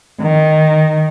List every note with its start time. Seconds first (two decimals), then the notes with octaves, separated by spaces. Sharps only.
0.22 D#3